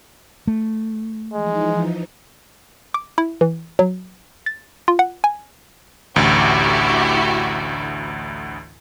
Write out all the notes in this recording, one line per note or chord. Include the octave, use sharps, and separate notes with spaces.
A3
E3 F3 G#3 D#4
D6
E4
E3
F#3
A6
F4
F#5
G#5
A1 D2 E4 F#4 G4